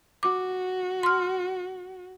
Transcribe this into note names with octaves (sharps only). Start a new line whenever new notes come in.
F#4 D6
C6 F6